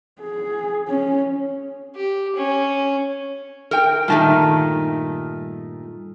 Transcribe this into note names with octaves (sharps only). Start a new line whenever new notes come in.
G#4
C#4
G4
C#4
A#4 G5
G2 A#2 D#3 A3 A5